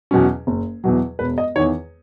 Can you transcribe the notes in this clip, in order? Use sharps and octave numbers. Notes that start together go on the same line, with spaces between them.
E2 B2 F#3 C#4
F#1
E2 B2 F#3
E1 B4
D#5
E2 D#3 C#5